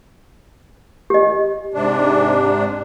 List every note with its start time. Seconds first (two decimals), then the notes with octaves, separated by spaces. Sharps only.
1.10 G4 D#5
1.74 G#2 C3 D4